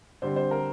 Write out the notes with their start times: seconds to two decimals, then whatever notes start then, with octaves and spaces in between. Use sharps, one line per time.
0.22 D3 G3 C4 C5
0.36 C5
0.51 A#4